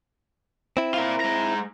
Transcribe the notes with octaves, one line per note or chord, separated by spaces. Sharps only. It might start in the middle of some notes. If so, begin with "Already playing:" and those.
C4 E4
F4 A#4
G#3 A#5